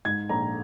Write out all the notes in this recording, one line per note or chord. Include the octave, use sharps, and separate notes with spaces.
G#2 G#6
A#1 A#5